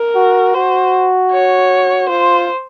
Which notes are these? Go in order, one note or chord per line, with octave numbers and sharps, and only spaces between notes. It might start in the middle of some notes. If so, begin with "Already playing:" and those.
Already playing: A#4
F#4
F#4 C5
C#5
F4 C5